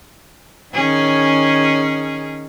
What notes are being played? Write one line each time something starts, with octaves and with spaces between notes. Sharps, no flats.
D#3 C#4 G#4